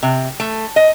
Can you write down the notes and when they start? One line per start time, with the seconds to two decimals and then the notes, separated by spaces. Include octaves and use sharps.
0.03 C3
0.40 A3
0.76 D#5